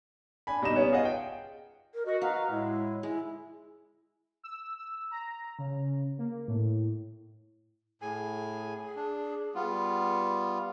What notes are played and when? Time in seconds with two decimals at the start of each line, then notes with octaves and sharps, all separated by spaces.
0.47 D4 G#5 B5
0.62 B2 G3 D#4 D#5 E7
0.76 B3 C#4 C#5
0.92 F4 G#4 D#5 F#5
1.05 G5
1.94 A#4
2.06 F#4 D#5
2.22 F#4 B4 D#5 F5 A#5
2.50 A2 G#3 E4
3.03 G#3 E4
4.43 E6
4.78 E6
5.11 A#5
5.59 C#3
6.18 A#3
6.48 A2
8.02 A2 G#4 G#5
8.96 D4
9.55 G3 B3 F4